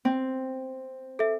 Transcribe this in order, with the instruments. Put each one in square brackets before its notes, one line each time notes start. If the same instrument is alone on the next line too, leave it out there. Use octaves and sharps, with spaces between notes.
[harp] C4
[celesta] A4 E5